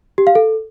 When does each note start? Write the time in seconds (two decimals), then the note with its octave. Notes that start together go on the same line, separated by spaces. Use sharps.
0.18 G4
0.27 F5
0.35 A4